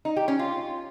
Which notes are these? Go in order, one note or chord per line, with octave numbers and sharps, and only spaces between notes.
D#4
G4
C#4
F4